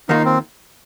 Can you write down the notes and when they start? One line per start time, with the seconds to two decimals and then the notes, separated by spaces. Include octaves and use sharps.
0.09 D#2 D#3 A#3 D#4 F4
0.25 C4